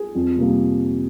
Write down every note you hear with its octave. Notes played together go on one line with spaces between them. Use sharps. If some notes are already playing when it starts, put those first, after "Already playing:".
Already playing: G#4
F2
C3 G3 A#3